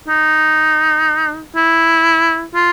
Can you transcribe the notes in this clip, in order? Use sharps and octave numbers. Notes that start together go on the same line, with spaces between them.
D#4
E4
F4